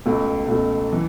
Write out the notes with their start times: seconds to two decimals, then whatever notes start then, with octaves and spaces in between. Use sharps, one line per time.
0.05 C#2 B2 A3
0.48 C#2 B2 A3
0.93 E3